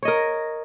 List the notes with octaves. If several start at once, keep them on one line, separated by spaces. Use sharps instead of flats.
A#4 C#5 D#5